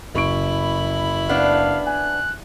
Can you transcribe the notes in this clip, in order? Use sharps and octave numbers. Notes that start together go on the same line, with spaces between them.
F#1 E4 B5 C#6 D7
B3 D4 F5
G#5 F#6